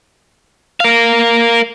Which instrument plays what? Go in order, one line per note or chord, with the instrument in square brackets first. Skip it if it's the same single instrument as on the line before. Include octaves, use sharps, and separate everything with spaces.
[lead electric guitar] A#4 F5